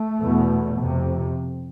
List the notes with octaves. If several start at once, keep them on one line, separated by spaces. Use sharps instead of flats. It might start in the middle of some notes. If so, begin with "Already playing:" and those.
Already playing: A3
E2 B2
F2 C3